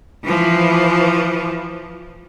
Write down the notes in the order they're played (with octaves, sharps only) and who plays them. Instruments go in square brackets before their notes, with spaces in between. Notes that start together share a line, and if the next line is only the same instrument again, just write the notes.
[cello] E3 F3